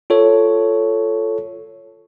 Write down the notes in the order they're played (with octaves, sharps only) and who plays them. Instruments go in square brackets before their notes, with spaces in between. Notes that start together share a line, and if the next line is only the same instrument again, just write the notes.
[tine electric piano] F4 A4 C#5